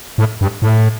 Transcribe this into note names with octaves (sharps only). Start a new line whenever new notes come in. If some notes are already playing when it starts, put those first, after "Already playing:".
A2
G2
A2